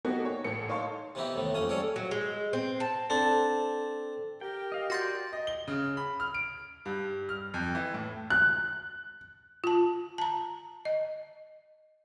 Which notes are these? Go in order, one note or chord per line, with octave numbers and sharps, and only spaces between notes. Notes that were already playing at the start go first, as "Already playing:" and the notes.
A#3 B3 D#4 F#4 G4 A4
C#5
A1 A#3 A4 C#7
D#4 C#5 F5 A5 C6 C#6
C3 E3 B3 D#4 E4 G4
D#2 A2 D#3 B3
F2 A#3 C#4 D#6
G3 C#4 G#4 A4 C#5 D5
F#3
G#3
C4
A5
C4 D4 A4
G4 A#4 G5
D#5 F5
F#4 D5 C6 G6 A6 A#6
D#5
G7
C#3
B5
F6
D7
G2
F6
F2
E3
A2
F#6
F4 A5
A5 A#5
D#5